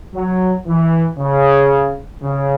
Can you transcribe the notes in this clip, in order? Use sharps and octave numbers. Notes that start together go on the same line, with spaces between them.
F#3
E3
C#3
C#3